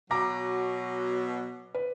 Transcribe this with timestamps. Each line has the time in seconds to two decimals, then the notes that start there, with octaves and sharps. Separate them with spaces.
0.11 B2 F#3 A#5 D6 A#6
1.74 B4